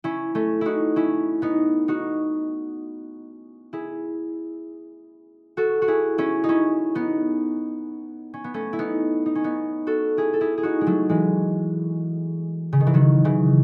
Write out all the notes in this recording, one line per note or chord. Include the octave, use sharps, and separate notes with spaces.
C#4 E4
A3 C#4
D#4 E4 F#4
C#4 E4
B3 D#4
D#4 F#4
E4 G#4
F#4 A4
F#4
E4 G#4
C#4 E4
D#4
C#4 E4
B3 D#4
C#4
B3
A3 C#4
E4
B3 D#4
D#4
C#4
B3 D#4
F#4 A4
E4 G#4
A4
E4 G#4
G#4
D#4 F#4
G#3
F#3 A3
E3 G#3
C#3
D#3
E3
D#3 F#3
C#3 E3